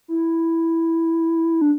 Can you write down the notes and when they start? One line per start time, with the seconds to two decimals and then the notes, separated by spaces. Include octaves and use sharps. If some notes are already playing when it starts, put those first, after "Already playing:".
0.08 E4
1.61 D4